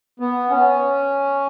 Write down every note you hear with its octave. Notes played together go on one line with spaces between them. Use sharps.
B3
C#4